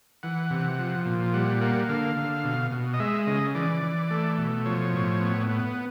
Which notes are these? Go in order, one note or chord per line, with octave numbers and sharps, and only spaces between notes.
E3 F#5
C3
F3
A#2
G3 F#5
A#3 F#5
D3 F5
D3
B2
B2
D#5
G#3 E5
C#3 D#5
E3 D5
E3
A3
B2
F3 C#5
A2
B3
B3